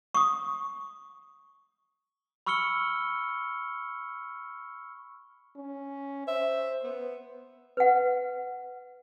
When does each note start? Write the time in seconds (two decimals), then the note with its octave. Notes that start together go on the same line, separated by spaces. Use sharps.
0.14 C#6 D#6
2.46 B5 C#6 E6 F6 C#7 G7
5.56 C#4
6.27 C5 E5
6.83 B3
7.77 B4 F#5